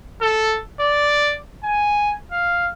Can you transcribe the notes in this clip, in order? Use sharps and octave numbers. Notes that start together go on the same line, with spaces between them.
A4
D5
G#5
F5